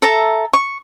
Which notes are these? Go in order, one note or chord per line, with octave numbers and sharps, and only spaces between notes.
A4 E5 A5 A#5
C#6